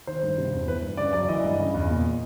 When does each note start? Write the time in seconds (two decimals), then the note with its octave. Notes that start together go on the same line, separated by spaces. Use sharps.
0.07 D#3 C5
0.23 G2
0.38 C3
0.53 E2
0.67 E3 B4
0.83 G2
0.97 C#3 D5
1.13 F#2 D5
1.29 E3 D#5
1.44 G2
1.59 C#3
1.74 E2
1.89 A#2